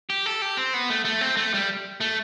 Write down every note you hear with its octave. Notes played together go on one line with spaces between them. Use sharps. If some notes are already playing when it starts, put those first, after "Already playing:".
G4
A4
G4
C4
B3
A3
A3
C4
A3
G3
A3